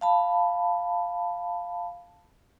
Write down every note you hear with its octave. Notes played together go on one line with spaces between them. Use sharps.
F5 A5 B5